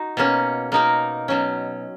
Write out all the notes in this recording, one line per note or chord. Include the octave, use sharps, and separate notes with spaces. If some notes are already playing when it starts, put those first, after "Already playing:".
Already playing: D#4 F#4
B2 A#3 C#4
B2 A#3 D#4 A#4
B2 F#3 C#4